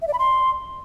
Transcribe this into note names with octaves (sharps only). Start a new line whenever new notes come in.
E5
D5
B5
C6